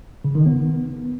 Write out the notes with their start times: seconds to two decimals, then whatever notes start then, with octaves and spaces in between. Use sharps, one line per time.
0.25 C#3
0.35 D#3
0.46 B3